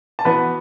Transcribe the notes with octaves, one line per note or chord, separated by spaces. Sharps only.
A5
E3 B3 F#4 B4 B5